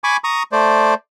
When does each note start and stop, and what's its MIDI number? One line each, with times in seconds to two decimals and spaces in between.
0.04 0.17 80
0.04 0.17 83
0.04 0.17 85
0.04 0.17 86
0.24 0.43 82
0.24 0.43 85
0.24 0.43 87
0.52 0.94 57
0.52 0.94 72
0.52 0.94 74